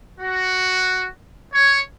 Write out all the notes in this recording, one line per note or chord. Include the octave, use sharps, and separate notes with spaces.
F#4
C#5